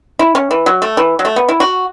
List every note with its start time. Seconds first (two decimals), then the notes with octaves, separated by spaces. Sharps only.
0.19 E4
0.35 C#4
0.51 E3
0.66 F#3
0.82 A3
0.97 E3
1.19 F#3
1.25 A3
1.36 B3
1.49 E4
1.60 F#4